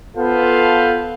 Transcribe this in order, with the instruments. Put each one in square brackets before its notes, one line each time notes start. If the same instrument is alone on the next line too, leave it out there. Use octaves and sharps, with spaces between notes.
[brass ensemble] B3 F4 A4 B4 C5 F5